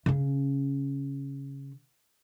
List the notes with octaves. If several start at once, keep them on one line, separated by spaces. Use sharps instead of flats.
C#3 C#4